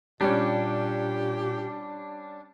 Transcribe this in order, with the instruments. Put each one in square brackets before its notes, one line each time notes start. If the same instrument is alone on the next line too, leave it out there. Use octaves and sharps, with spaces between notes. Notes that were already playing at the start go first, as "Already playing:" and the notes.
[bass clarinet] A#2 [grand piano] G3 C#4 [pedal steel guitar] D4 [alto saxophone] G4